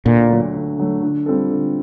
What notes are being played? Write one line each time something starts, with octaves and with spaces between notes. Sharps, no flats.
D2 A#2
D3 F#3 A3
D2
D3 F#3 A3
D3
G3 C4 F4 A4
D3